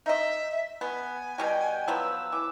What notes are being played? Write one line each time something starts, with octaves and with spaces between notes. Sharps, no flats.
D#4 D#5 E5
B3 G#5
B2 G3 F#4 G5
F3 F#3 B3 E6
E3 D6